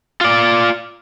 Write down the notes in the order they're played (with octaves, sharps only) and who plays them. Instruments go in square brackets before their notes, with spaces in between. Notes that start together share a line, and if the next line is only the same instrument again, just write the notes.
[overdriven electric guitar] F4 D5